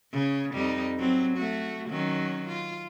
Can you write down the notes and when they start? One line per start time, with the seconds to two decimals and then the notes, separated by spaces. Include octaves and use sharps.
0.12 C#3 C#5
0.54 F2 G3 D#4
0.98 F#3 C4
1.37 A3 F#4
1.89 D#3 F#3 C#4
2.47 F4